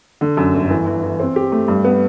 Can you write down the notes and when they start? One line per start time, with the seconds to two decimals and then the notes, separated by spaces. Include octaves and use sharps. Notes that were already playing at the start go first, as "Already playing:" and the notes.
0.21 D3
0.37 F#2
0.54 G1
0.70 E3
0.87 E3
1.03 E3
1.20 C4
1.36 G4
1.52 A3
1.68 G2
1.84 B3